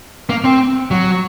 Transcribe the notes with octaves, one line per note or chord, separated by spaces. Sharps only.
A#3
C4
F#3